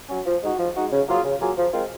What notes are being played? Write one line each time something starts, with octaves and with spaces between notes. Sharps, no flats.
F#3 C#4
F3
G#3 D#4 F#4
F3
G#3 D#4 F#4
C#3
F#3 A#3 F4 G#4
C#3
F#3 A#3 F4 G#4
F3
G#3 C4 F4 A#4